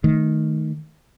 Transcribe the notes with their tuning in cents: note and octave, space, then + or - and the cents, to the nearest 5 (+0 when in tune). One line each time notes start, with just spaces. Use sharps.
D#3 +0 A3 -10